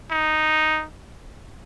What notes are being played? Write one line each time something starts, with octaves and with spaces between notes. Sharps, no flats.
D#4